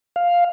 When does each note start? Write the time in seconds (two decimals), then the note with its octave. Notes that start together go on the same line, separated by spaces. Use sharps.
0.16 F5